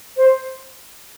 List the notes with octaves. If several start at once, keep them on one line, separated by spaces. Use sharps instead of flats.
C5